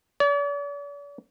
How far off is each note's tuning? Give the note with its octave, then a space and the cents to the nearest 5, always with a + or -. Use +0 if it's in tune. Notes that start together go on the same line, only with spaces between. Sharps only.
D5 -45